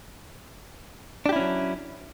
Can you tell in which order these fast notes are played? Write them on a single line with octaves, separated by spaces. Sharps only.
D4 G4 E4 C#4 F#3